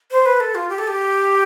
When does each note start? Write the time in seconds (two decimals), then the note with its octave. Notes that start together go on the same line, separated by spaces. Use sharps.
0.11 C5
0.26 B4
0.40 A4
0.55 F4
0.69 G4
0.78 A4
0.87 G4